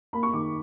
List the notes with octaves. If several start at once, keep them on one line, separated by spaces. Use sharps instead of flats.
A#3 B5
C#6
D#3 D6